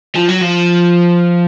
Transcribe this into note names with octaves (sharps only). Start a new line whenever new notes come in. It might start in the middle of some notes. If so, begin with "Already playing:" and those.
F3
F#3
F3